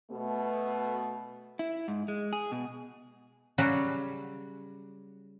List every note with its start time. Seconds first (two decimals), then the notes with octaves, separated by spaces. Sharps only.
0.11 B2 A3
1.59 E4
1.88 G#2
2.08 G#3
2.33 G#4
2.52 B2
3.58 C#3 F#3 G3 F#4